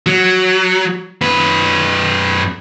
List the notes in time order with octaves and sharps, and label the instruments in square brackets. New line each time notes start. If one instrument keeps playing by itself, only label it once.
[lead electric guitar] F#3
F#2 B4